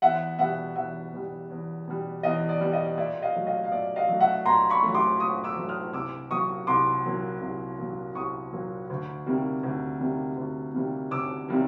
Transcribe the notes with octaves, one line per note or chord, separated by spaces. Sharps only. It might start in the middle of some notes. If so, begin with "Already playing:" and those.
E2 E5 F#5
B2 G3 E5 F#5
E2 E5 F#5
B2 G3
E2
B2 G3
E2 D#5
D5
B2 G3
D#5
A#2 D5 E5
D#5 F5
F#3 A3
D#5 F5
F5
A#2 D5 E5
D#5 F5
F#3 A3
E5 F#5
A#2 A#5 C6
B5 C#6
F#3 A3
C6 D6
A#2 C#6 D#6
D6 E6
F#3 A3
D#6 F6
C2 D6 E6
A#2 F#3 A#3 C#6 D#6
C2 C6 D6
A#2 F#3 A#3
C2
A#2 F#3 A#3
C2 C#6 D#6
A#2 F#3 A#3
D2
C3 D#3 G3 A#3
D2
C3 D#3 G3 A#3
D2
C3 D#3 G3 A#3
D2 D6 E6
C3 D#3 G3 A#3